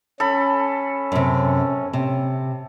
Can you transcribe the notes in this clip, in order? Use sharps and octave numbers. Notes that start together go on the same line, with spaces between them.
C#4 A4 B5
F#2 C3
C3